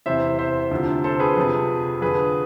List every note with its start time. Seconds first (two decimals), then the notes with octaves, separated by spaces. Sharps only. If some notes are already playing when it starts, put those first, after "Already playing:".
0.06 E2 C3 E3 C5 E5
0.39 C5 E5
0.71 D2 C3 F3
1.04 A4 C5
1.20 G#4 B4
1.37 F2 C3 F3
2.01 F2 D3 F3 G#4 B4